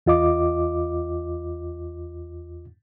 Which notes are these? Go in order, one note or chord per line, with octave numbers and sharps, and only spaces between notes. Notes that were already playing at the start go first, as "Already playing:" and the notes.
E2 F4 D#5 D6